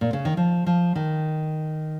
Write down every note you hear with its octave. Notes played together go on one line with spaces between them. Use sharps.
A#2
C#3
D#3
F3
F3
D#3